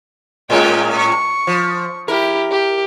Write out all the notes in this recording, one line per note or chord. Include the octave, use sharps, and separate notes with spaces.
A2 G#3 C#4 A#4 G5
C#6
F3
E4 G4 A#4
G4